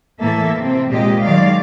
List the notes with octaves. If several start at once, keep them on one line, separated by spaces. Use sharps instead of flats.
A2 E3 A#3 A4 E5
C3 C4
A#2 G#3 G4 D#5
D#3 F#3 G#3 D5 F5